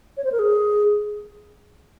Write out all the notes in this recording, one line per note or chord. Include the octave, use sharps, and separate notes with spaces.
C#5
C5
A#4
G#4